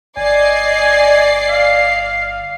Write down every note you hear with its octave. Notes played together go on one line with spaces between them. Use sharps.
G1 D5 D#5 G#5 C7
F5